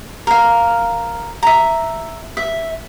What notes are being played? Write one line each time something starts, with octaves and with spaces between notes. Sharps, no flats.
A#4 F5
E5 A#5
E5